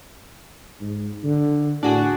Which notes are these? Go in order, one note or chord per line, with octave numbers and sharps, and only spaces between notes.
G#2
D3
A2 D4 F#4 G#4